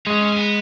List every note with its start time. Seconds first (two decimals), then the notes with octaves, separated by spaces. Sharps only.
0.06 G#3 C#4
0.21 C#4
0.33 C#4
0.36 B3